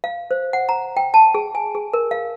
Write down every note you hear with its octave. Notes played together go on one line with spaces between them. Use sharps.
F5
C5
F#5
A#5
G5
A5
G#4
G#5
G#4
A#4
F5